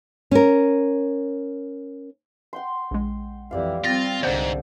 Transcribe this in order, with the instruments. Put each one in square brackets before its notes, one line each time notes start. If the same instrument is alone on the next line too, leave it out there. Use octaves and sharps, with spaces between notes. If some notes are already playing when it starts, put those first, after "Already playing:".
[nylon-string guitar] C#4 A#4
[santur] F#5 G5 C6
[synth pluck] A#1 G#3
[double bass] F2 E3 [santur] G4 D5 F5
[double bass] G3 C4 [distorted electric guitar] F4 [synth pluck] A6 A#6
[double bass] C2 D3 [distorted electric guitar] F2 G#2 [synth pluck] C5 D5 F#5